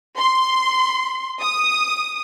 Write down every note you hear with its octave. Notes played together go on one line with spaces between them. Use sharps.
C6
D#6